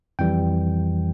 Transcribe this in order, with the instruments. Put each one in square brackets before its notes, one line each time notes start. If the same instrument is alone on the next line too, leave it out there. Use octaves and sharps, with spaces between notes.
[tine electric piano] F2 E3 G3 G5